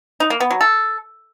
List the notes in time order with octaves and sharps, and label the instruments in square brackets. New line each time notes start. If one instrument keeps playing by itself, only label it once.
[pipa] D#4
A#3
B3
F#3
A4